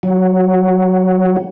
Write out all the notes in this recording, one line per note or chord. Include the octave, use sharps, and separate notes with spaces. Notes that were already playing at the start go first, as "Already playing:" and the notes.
F#3